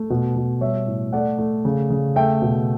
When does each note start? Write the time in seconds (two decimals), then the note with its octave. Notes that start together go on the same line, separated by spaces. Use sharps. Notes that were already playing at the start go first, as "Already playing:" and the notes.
Already playing: A3
0.10 B2
0.36 B2
0.61 G3 C#5 E5
0.87 A2
1.12 A3 D5 F#5
1.39 A3
1.65 C#3
1.90 C#3
2.16 A3 E5 G5
2.42 B2